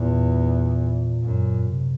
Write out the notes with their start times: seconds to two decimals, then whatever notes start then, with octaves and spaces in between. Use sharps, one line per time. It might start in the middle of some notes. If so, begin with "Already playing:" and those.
Already playing: E2 A#2
1.24 F#2
1.67 C3